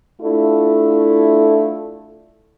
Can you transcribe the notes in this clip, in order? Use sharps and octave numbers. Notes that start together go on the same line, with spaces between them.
A3 D4 E4 F4 A4